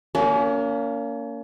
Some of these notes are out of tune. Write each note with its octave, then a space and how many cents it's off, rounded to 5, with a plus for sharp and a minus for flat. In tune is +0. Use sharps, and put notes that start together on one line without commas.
A#3 -15 C#4 +35